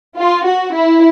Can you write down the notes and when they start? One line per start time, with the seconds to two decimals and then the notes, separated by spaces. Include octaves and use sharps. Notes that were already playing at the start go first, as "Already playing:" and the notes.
0.17 F4
0.46 F#4
0.74 E4